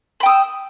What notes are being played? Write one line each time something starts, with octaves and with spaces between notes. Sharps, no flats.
G5 B5 D#6 E6